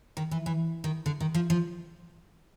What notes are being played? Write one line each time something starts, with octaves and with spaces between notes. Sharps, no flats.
D#3
E3
E3
D#3
D3
D#3
F3
F3